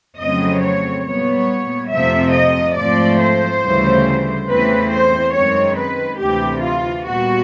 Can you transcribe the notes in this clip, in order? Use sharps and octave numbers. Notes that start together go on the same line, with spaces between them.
F2 C#3 F#3 A3 C4 D#5
C#5
A#2 G3 B3 C#5
F2 C3 F3 A3 E5
D#5
G#2 F3 A3 C4 D5
C5
D2 C#3 E3 G3
E2 C#3 E3 A3 C4 B4
C5
F#2 D#3 G#3 C4 C#5
B4
D2 C3 E3 G4
F4
A#2 G3 B3 F#4